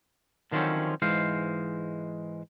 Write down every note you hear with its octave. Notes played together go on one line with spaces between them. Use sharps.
D3 D#3 F3 F#3 C4 C#4
G#2 E3 G#3 C5 F5